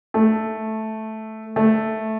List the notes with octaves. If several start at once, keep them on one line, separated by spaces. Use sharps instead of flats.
A3
A3